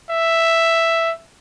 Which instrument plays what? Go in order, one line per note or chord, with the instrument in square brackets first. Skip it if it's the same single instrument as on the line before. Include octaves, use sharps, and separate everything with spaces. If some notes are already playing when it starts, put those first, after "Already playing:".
[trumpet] E5